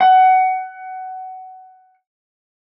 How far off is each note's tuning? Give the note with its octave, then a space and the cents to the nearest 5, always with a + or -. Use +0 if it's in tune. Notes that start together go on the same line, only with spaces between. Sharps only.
F#5 +20